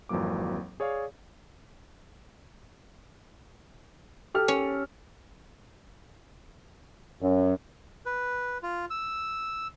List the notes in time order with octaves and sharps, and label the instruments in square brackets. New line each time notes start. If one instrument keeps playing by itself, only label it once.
[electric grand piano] G#1 F2 E3 F#3 A#3 D6
G#4 C#5 D5 F5
[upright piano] G4 A4 F6
[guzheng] C#4
[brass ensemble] F#2
[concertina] B4
F4
E6